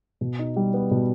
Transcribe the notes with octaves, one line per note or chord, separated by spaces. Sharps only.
B2
D#4
G3
B3
B2